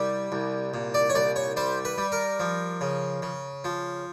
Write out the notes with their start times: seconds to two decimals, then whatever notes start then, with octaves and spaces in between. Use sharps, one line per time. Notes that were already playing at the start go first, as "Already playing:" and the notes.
Already playing: C2 G3
0.32 C2
0.74 A#2
0.94 D5
1.10 C#5
1.15 C2 D5
1.36 C#5
1.57 G3 C5
1.85 B4
1.98 G3
2.12 A#4
2.40 F3
2.81 C#3
3.22 C#3
3.64 F3